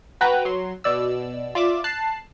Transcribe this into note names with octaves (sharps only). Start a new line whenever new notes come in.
F#4 B4 G5 A#5
F#3 C6
B2 D5 E6
F4 D5 E5 D6 E7
A5 F#6 C7